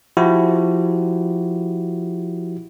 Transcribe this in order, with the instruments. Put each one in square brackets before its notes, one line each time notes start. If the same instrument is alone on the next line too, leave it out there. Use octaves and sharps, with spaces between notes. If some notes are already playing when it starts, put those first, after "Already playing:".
[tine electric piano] F3 E4 F#4 G4